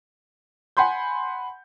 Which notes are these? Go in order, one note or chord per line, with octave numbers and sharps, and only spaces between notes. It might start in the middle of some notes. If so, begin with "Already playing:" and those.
F#5 G#5 B5 C6 G6